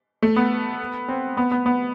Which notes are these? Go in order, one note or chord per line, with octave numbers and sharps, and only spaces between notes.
A3
B3
C4
B3
B3
B3